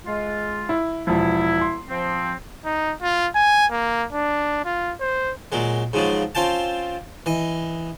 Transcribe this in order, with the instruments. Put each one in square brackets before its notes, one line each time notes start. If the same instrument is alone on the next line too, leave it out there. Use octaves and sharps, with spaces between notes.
[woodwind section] G#3 F4
[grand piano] E4
[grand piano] E1 F3 [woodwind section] E4
[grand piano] C6
[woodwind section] F3 C4
[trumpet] D#4
F4
G#5
A#3
D4
F4
C5
[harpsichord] A#2 F#3 G#3
G#2 C#3 F3 F#3
C4 C#4 F4 G5 A5
E3 D#5